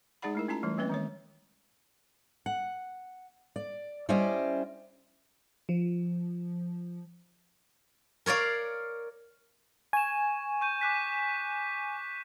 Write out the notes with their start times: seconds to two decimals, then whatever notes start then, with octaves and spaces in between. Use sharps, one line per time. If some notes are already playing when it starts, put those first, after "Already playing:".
0.22 G#3 D#4 G#4 D5 F#5 B5
0.35 A3 E4 A#4
0.48 C#4 E4 F4 A5 A#5
0.63 E3 G3 A3
0.78 G3 A#3 C4 C#4 B4 D#5
0.90 D#3 G#3 C#5
2.46 F#5
3.56 D5
4.09 G3 C#4 E4 C5 D5 D#5
5.69 F3
8.26 A#4 C#5 D5 F5
9.93 G#5 C#6 E7
10.61 C#6 G6 D#7
10.81 D6 F#6 B6